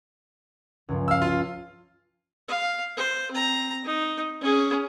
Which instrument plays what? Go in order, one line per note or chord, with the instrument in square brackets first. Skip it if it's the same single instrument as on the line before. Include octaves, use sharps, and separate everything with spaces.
[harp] C#2 G2 F3
[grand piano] F5 E6
F4
[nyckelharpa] F5
C5
C4 A#5
D#4
C#4 G#4